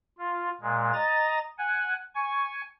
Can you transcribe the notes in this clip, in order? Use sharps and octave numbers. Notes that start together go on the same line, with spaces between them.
F4
A#2 G#3
D#5 A#5 A6
F#5 G#5
G#5 C#6